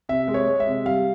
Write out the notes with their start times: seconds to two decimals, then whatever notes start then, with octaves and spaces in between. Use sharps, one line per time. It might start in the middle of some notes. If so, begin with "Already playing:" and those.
0.09 C3 E5
0.28 G#3
0.34 C#5
0.47 G#3
0.60 E5
0.67 C3
0.85 G3 F5